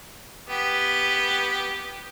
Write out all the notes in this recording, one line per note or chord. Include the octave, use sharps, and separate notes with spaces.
B3 G4